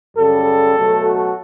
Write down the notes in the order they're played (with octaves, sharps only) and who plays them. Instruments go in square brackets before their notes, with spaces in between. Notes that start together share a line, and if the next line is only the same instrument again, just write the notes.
[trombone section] F#2 C#3 G3 A4
B2 F#3 A3
F#4